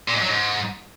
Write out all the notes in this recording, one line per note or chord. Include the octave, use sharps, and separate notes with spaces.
A#2
G#2
F#3
G#2